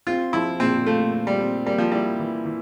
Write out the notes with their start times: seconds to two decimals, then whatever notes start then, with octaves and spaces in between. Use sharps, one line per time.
0.07 C4 F4
0.33 F3 E4
0.60 A#2 C4
0.86 A3 F4
1.14 C4
1.27 G3
1.40 C4
1.66 G3 A#3
1.78 F3
1.92 G3 E4
2.20 E3
2.46 E3